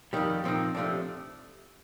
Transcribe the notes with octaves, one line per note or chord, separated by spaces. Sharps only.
F2 D#3 G3
A#2 F3 C4 D#4
C3 F3 A3 D4